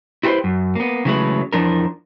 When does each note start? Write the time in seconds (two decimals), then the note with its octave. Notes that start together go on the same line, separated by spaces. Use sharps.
0.23 E4 F#4 G4 A4 B4 C5
0.44 F#2
0.75 A#3 B3
1.05 C#3 E3 F#3 G#3 A3 B4
1.53 E2 E3 F3 D4 A#4